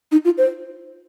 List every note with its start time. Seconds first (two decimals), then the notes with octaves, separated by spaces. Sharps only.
0.12 D#4
0.25 F4
0.38 C5